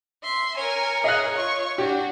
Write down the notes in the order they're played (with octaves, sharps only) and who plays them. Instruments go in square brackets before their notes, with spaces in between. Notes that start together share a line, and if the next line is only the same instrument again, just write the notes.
[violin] E5 C6
[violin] A#4 G#5 [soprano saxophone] C#5
[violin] G#4 A#4 [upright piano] D#5 F5 F#6
[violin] F4 C#6
[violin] D4 F#4 [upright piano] G4